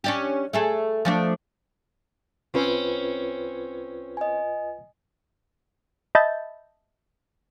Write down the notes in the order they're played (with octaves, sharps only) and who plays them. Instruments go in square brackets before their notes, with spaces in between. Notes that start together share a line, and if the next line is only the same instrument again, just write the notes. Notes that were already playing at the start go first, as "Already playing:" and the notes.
[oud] C#4 D4 G4
A3 G#4 A4
F3 A3 D4
[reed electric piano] C2 F4 B4 [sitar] C4 C#4
[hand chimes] D#5 G#5
[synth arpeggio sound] D#5 E5 A5 B5 G6 A6